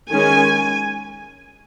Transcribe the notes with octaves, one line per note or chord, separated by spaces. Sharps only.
D#3 G#3 C#4 G#5